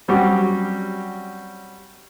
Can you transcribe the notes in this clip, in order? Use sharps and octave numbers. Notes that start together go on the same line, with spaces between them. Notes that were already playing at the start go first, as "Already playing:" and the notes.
F#3 G3 C4 C#4 F#4 G4